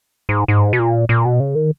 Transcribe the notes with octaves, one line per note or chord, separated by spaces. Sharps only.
G#2
G#2
B2
A#2
A#2
B2
C#3
D#3